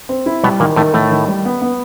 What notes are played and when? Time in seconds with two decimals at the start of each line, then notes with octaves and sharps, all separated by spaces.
0.09 C4
0.26 E4
0.43 B2 G3 B3
0.60 A#2 D#3 A#3
0.76 A2 D#3 A3
0.94 A2 D#3 A3
1.11 D#3
1.28 G3
1.45 B3
1.62 B3